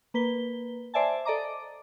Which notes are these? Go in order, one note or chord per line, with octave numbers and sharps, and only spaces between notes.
A#3 B4 G7
C5 D5 E5 G#5 A5
A4 D5 D#5 A#5 D6